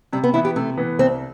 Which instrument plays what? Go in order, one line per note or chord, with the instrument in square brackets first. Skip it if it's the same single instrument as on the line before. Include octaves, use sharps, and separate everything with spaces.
[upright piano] C3 [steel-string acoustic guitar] G3
[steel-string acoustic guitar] B3
[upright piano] E3 B3 [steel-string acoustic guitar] E4
[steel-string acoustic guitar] G4
[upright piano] C3 [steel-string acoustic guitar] A3
[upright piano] E3 B3
[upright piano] C2 [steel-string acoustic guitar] C4